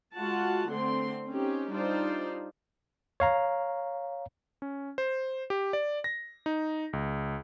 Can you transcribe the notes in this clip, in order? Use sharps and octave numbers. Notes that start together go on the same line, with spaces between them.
G#3 F4 F#4 F#5 A5
D3 A3 C4 C6
C4 C#4 D#4 G4
G3 D4 D#4 F4 C5 D5
C#5 F5 A#5
C#4
C5
G4
D5
A#6
D#4
C#2